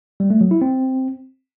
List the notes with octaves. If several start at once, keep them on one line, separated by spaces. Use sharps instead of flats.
G3
A3
F#3
E4
C4